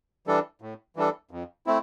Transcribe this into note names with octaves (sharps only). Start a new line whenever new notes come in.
E3 G3 D4 A4
A2
E3 G3 D4 A4
F2
A3 C4 E4